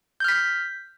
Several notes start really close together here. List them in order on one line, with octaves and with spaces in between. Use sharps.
G6 F6 B6